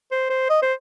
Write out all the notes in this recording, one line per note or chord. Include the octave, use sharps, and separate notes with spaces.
C5
C5
D#5
C5